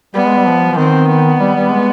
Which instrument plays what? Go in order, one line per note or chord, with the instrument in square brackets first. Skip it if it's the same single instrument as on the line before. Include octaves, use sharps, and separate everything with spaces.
[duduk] G3 [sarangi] B3
[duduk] G#3
G3
F3
F3
[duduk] D#3 [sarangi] C4
[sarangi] B3
[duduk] G3
G3
G#3